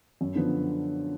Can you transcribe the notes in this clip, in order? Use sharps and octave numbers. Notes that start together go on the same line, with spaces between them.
F#2
D3 F3 B3